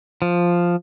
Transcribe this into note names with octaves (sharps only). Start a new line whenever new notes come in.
F3